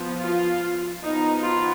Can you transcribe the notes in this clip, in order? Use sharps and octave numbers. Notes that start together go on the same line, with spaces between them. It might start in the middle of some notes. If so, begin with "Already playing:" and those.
Already playing: F3 B3
F4
F3 B3 D#4
F4